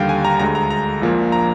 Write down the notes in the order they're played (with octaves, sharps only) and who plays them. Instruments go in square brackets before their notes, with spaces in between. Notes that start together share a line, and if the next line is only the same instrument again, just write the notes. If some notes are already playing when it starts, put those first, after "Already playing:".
Already playing: [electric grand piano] D#2 D3 G3 F5 G5
G#5
A#5
D2 D3 G#3 A#5
A#5
A#5
A#1 A#2 F3 A#3
A#5